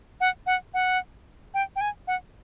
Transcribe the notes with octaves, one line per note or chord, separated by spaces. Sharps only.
F#5
F#5
F#5
G5
G5
G#5
F#5